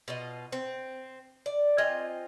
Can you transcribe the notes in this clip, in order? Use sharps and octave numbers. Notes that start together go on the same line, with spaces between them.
B2 F4 D#5
C4
D5
C4 F4 D#5 G#5